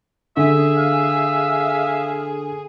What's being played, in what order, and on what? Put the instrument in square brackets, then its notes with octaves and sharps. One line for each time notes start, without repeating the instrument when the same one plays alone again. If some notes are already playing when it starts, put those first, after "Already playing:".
[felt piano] D3 [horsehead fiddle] G#4 [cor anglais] E5
[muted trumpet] F5